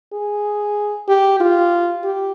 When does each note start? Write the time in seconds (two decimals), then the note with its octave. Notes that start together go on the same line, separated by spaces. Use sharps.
0.13 G#4
1.08 G4
1.40 F4
2.04 G4